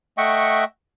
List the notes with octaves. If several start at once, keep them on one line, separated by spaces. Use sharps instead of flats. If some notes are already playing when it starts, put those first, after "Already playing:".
A3 D#5 E5 F#5 G5 C#6